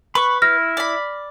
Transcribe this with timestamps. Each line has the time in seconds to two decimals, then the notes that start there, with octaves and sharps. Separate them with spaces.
0.15 B4 B5 C#6
0.42 E4 F6 A#6
0.77 D5 B5